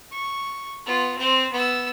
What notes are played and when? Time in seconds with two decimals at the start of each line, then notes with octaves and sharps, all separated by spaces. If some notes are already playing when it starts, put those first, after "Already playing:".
0.12 C#6
0.86 B3 F4
1.18 C4 C5
1.52 B3 E6